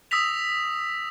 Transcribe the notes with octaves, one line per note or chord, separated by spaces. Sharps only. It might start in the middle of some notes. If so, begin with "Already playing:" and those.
D#6 E6 A#6 B6 F7